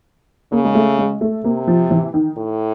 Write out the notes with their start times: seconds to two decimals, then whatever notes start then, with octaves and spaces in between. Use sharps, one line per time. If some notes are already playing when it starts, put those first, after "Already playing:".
0.52 C#3 A#3
0.65 G#3
0.75 A3
0.98 G#3
1.21 A3
1.44 C3 A#3
1.67 F3
1.91 E3
2.14 D#3
2.38 A2